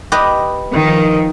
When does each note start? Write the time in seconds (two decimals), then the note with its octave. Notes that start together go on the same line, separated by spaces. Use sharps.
0.12 G4 B4 D#5
0.74 D#3 F3